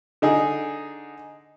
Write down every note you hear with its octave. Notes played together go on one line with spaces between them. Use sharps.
D3 D#4 G#4